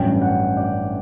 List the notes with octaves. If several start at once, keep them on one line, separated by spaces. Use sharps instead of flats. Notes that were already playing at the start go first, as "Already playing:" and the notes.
Already playing: A1 G2 F#3 C#4 G5
F#5
D5